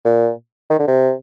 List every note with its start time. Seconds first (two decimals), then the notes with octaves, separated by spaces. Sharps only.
0.05 A#2
0.70 D#3
0.79 D3
0.87 C3